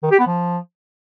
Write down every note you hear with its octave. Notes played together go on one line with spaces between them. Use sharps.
D#3
G4
B3
F3